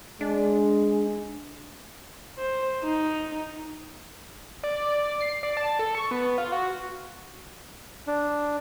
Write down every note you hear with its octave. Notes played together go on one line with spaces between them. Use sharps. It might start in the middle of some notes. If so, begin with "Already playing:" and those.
G#3 D4
C5
D#4
D5
C7
D5
A5
A4
C#6
B3
F4
F#4
D4